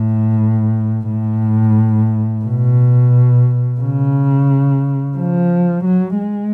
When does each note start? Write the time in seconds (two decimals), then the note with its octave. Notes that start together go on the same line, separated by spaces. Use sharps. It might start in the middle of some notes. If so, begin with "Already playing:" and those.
Already playing: A2
1.09 A2
2.44 B2
3.80 C#3
5.17 F3
5.84 F#3
6.19 G#3